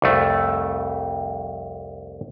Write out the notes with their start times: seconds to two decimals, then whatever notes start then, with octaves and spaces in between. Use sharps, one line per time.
0.02 C2 F2 A3